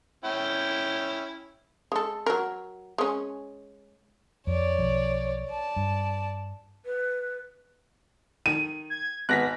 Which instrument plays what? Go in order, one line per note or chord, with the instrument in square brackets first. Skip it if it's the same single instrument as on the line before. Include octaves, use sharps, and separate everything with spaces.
[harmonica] C#4 E4 G5
[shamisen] G#3 A4
F#3 A#4
G#3 C#4
[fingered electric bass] F2 [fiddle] C#5 D5
[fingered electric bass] B1 F3
[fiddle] D5 A5
[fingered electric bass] G2
[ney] B4
[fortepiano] D#3 [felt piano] D#7
[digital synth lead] G#6
[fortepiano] G#1 [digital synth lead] B3 [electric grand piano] F#6 A#6 B6